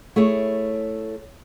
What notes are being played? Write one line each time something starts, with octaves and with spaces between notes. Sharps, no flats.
A3 E4 G#4 C#5